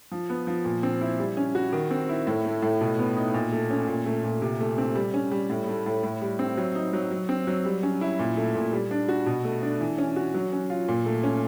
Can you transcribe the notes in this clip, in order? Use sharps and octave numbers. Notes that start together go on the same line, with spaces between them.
F3
B3
F3
A#2
C4
E4
G3
C#4
F#4
D#3
C4
E4
A2
A3
A2
B2
B3
D#4
A#2
A3
C#4
A#2
A3
A#2
C3
A3
C4
G3
C#4
G3
A2
A3
A2
A2
G3
C4
F#3
D#4
F#3
F#3
C4
F#3
G3
C#4
E4
A#2
A3
A#2
G3
D4
F#4
B2
A3
D4
E3
C#4
F#4
F#3
C#4
F4
A#2
A3
C#4